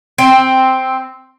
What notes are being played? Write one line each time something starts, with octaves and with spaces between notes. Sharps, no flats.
C4